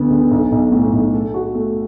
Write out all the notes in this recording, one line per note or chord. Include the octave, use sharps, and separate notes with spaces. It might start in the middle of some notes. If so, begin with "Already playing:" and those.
Already playing: D2 D3 B3
D3
B1
B1
A2
B1
A4
F#4
A3